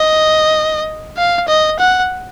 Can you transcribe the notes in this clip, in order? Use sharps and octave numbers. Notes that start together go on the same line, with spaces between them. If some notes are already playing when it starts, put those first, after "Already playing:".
Already playing: D#5
F5
D#5
F#5